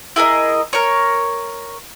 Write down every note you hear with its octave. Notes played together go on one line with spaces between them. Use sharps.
E4 G#4 A#4 D#5
A#4 C#5